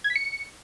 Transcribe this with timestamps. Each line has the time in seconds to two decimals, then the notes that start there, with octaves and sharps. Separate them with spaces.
0.04 G#6
0.10 B6
0.16 C#7